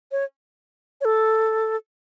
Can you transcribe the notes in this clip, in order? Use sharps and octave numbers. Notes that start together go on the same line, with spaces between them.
C#5
C#5
A4